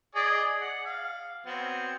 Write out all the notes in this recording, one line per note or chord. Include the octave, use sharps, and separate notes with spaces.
G#4 D5 D#5
F#5
F5
F#3 B3 C4